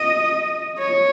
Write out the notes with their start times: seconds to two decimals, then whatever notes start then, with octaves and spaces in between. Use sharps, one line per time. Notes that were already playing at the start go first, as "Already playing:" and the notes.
Already playing: D#5
0.79 C#5